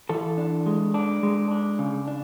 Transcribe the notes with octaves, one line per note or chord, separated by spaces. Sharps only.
E3 A4
D4
G#3
D4
G#3
D4
C#3
D4